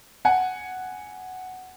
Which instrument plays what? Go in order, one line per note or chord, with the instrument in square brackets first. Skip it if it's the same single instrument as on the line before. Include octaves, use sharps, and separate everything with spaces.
[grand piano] F#5 G#5